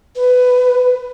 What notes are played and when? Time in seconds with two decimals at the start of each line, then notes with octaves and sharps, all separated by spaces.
0.16 B4